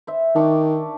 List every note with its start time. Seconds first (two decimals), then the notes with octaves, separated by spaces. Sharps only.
0.07 C5 E5
0.35 D#3 D4 C#6 D6